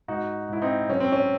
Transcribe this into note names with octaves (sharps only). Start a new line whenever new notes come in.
G#2 D#4 F#4
G#2 E4
C4 D#4
F#3 C#4
C4
C#4